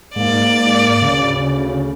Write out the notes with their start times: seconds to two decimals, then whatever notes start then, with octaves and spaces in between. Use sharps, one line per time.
0.16 G#2 A#3 D5 F5
1.02 D2 C#3